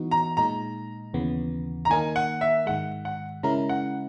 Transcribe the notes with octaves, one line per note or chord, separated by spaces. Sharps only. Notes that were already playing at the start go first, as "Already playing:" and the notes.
Already playing: E3 B3 D#4 F#4
A#5
A#2 G#3 D#4 A#5
D#2 C#3 E3 B3
A#5
D#3 A#3 D#4 A#4 G#5
F#5
E5
G#2 D#3 G#3 F#5
F#5
C#3 G#3 C#4 E4 A#4 A#5
F#5